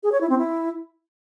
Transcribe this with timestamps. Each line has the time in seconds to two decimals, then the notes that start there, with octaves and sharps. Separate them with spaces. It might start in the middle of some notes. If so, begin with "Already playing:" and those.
0.03 G#4
0.12 C#5
0.21 E4
0.29 C4
0.38 E4